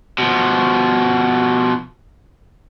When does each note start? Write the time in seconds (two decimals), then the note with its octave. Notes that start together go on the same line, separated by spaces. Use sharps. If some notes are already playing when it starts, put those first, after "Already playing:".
0.18 B2 F3